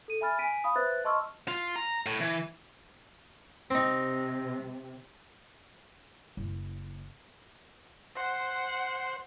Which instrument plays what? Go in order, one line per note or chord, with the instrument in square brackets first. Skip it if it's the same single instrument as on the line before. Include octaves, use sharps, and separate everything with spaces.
[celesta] A4 D#7
E5 G#5 B5 F6 A6
G#5 B6 D7 D#7
F5 B5 D#6
B4 C5 E5 F#6 A6
D#5 A5 C6 C#6 E6 F6
[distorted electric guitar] F4
A#5
A2
E3
[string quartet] C3 [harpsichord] C4 D#4
[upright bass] F#1 E4
[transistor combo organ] C5 [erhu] F#5